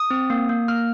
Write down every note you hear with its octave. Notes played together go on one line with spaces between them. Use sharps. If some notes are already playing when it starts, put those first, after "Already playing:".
Already playing: D#6
C4
A#3
A#3
A#3 F6